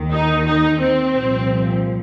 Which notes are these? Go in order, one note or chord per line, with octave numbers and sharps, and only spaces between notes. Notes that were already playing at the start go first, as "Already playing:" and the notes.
Already playing: D#2 D#3
D#4
D#4
C4
C2 A#2 F3